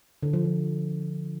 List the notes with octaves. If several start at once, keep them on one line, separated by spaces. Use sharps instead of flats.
D3
F3
F3